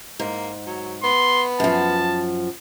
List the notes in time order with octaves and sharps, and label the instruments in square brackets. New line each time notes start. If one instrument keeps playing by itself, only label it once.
[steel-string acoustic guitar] G#2 [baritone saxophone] A#3
[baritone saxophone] F#3
[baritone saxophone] B3 [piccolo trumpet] C6
[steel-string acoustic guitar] F#2 F3 [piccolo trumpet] A5